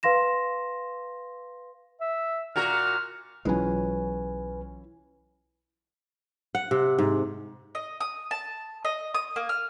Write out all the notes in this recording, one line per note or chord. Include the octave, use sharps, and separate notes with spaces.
B4 F5 C6 A#6 E7
E5
A#2 F#4 A#4 F6
B1 E3 F#3 G#3 C#4 F4 B4 G#5
F#5
C3
G#2
D#5
D#6
A5
D#5
D#6
A#3
F6